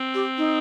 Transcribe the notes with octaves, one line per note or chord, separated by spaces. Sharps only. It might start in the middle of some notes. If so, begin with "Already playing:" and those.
Already playing: C4
G4
D#4